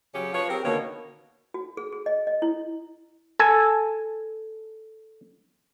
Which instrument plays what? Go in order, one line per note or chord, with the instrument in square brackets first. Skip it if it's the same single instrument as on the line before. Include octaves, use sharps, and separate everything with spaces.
[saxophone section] C#3 F#3 C#4 G4
F3 B4 C#5
C4 G4 G#4 A#4
B2 D3 D#3 A#3 C#5
[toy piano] F#4
G#4
G#4
D#5
D#5
E4
[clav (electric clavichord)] A4 G#5